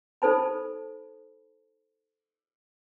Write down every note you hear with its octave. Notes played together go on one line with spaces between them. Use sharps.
D#4 A4 C5 A5 B5